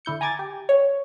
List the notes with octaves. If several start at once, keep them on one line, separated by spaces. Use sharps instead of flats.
D3 E4 G6 C#7
G#5 A#5 D6 G#6 A6
G4
C#5